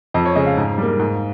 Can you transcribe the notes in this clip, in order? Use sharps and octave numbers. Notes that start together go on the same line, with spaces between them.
F2 D#5
C#5
C#3 G#3 D#5
F5
G#2
G3 A#3
G#2